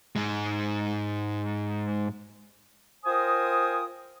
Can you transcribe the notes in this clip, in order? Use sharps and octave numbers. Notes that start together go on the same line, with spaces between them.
G#2 G#3
F4 A#4 C5 G5 G#5 D#6